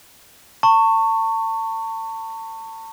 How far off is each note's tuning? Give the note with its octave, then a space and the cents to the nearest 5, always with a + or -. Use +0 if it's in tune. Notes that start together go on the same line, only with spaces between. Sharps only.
A5 +35 C#6 -5